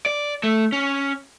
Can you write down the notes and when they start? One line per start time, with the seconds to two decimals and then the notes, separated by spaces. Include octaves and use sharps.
0.06 D5
0.43 A3
0.72 C#4